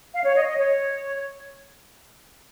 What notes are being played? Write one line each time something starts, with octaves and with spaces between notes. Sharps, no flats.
F5
C#5
D#5
D#5
C#5